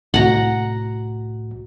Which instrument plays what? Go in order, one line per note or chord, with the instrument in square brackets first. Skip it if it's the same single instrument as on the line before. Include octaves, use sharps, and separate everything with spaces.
[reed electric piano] C2 A2 F#4 [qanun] F#5 A#5